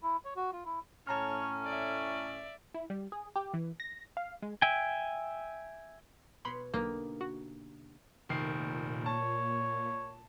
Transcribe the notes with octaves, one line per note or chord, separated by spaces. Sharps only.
E4
C#5
F#4
F4
E4
A2 C#4 C#5 A5 A#5 F6
D5 E5
E4
G3
G#4
G4
E3
A#6
F5
G#3
E5 G5 G#5
B2 C#5 B5 C6
B1 D3 A#3 D#4 G4
F#4
F1 A#2 D#3 C7
C#5 A5